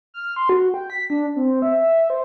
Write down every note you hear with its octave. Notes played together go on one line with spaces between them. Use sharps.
F6
C6
F#4
G5
B6
D4
C4
E5
C5